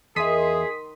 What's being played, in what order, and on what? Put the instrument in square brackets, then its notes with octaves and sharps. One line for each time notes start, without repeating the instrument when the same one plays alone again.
[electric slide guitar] E2 E5 [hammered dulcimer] D#3 [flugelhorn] G#4 [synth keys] C6 D#6 B6